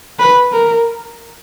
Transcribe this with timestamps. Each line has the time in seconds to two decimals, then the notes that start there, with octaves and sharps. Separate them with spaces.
0.19 B4
0.52 A#4